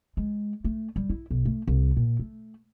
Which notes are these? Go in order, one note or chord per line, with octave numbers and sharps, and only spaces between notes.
G#3
A3
G3
E4
B1
A3
C2
A#2
A3